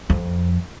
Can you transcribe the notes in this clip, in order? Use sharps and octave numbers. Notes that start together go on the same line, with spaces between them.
F2